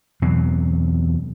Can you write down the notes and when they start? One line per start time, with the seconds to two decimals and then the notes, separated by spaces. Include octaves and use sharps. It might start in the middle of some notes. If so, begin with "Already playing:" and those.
0.22 E2 B2 F#3 C4